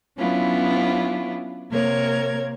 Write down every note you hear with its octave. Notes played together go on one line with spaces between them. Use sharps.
F#3 B3 C#4 D4 E4 F4
C3 A#3 A#4 C#5 G#6